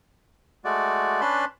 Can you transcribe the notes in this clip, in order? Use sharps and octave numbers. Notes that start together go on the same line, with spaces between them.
G#3 A3 F#4 D5
C#4 D4 B4 A5 B5 C6